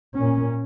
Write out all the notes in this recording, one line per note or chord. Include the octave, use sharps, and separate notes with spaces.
A#2 A#3 C#4